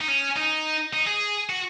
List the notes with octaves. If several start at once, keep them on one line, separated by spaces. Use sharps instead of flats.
D#4
C#4
D#4
D#4
G#4
F#4